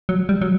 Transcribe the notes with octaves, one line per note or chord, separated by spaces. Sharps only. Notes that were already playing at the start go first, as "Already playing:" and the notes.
F#3
G3
F#3